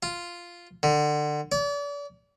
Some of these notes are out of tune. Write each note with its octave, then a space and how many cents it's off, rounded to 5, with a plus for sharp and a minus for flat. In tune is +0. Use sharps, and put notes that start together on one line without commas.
F4 -5
D3 +25
D5 -40